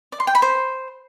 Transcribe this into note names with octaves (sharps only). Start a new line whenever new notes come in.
D5
C6
G5
B5
C5